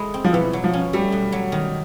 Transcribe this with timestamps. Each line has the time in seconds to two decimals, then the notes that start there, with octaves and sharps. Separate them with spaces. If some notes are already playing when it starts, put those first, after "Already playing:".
Already playing: G#3 E4 A4
0.14 C4
0.24 F3
0.33 B2 E3
0.53 F#3
0.64 F3
0.73 C#4
0.93 G3 A3
1.12 B2
1.32 F#3
1.52 D#3